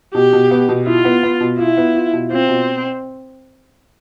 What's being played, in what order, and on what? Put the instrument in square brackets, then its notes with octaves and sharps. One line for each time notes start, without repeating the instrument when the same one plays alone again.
[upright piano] B2 [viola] G4
[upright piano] B2
B3
B2
[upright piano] E4 [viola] F4
[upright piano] B3
B3
B2
[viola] E4 [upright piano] F4
[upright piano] B3
F4
B2
[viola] C4 [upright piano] F4
[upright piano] B2